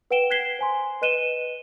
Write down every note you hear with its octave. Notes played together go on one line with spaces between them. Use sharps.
B4 F#5 G5 D7 E7 G7
F#6 G#6 B6 C7 G7
C5 G#5 C6
B4 D#5 F#6 D#7 E7 G7